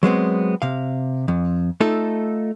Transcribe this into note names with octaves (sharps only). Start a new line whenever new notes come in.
F#3 G#3 B3 C4
C3 F5
F2
A3 D#4 F4 A4